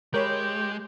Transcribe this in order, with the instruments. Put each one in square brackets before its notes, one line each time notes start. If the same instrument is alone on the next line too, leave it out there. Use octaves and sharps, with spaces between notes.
[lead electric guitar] G#3 [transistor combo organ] G4 [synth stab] A#4 C#5 B5